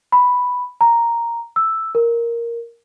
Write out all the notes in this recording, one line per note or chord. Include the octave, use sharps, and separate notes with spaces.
B5
A#5
E6
A#4